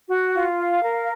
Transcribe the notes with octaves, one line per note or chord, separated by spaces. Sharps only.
F#4
F4
F5
A#4